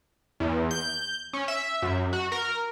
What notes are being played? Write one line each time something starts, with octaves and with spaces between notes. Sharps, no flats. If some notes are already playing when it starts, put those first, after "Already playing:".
E2
G6
C#4
E5
F#2
F#4
A#4